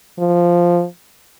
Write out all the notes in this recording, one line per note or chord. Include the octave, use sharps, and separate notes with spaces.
F3